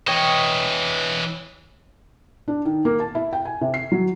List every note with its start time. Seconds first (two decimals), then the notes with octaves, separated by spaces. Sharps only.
0.08 E3 C#5 D#5 G5
2.48 D4
2.65 D#3
2.85 A#3
3.00 A5
3.15 E4
3.33 G5
3.45 G#5
3.61 C3
3.74 C7
3.92 F#3